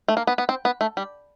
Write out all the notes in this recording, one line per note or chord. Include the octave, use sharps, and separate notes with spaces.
A3
A#3
B3
B3
C4
B3
A3
G3